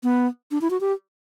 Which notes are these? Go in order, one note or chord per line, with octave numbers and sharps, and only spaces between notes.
B3
D4
E4
F#4
G4